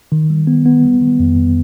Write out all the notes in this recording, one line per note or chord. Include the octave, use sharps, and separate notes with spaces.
D#3
G3
B3
B3
G3
D#3
F2
F2